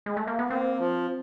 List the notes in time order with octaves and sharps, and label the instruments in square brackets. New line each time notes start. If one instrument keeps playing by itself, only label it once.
[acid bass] G#3
A3
A#3
B3
[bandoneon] A#3 [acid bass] C4
[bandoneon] F3